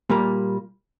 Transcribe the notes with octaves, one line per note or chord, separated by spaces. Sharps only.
A#2 G3 A#3